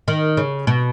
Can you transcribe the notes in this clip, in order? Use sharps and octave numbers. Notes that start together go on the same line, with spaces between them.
D#3
C#3
B2